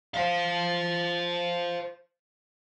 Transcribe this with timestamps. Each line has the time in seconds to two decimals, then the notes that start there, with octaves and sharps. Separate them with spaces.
0.14 C5 F5